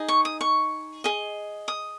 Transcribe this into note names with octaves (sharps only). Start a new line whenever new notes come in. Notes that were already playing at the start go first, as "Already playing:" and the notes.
Already playing: D#4 G#4 D#5
C#6
D#6
C#6
G#4 D#5
D#6